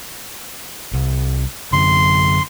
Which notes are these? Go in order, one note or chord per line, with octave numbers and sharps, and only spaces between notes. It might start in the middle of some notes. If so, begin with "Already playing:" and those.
C2
F#2 D3 C6